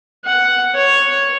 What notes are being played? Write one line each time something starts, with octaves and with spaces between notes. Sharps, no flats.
F#5
C#5